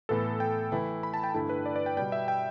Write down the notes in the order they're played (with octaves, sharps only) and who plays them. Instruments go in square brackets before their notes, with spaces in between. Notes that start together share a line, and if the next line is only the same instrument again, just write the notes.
[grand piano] A2 E3 B3 [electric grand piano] A4
[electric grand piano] G5
[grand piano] E3 A3 E4
[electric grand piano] B5
A5
G5
[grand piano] G2 D3 A3 E4
[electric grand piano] B4
D5
D5
G5
[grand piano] B2 G3 B3 [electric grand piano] G5
[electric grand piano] E5
G5